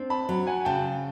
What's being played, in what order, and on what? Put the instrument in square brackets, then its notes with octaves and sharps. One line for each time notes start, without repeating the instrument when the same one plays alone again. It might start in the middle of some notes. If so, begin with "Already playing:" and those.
Already playing: [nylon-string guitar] C4 D4
[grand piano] A5 B5
[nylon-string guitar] F#3
[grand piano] F#5 G#5
[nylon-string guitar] C#3 [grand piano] G5 A5